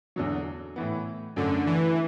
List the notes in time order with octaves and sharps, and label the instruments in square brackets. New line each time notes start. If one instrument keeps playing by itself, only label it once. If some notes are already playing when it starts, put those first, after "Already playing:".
[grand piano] E2 D3 F#3
A2 E3 B3
[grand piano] F#2 F#3 A3 [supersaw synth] D3
[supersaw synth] E3